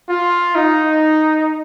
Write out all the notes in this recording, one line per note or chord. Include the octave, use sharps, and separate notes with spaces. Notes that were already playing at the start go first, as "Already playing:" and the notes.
F4
D#4